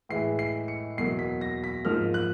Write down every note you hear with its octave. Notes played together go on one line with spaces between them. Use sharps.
A2 E3 G#3 C7
C7
C#7
E2 B2 F#3 A#3 C7
B6
A#6
B6
G#2 F3 A#3 F6
F#6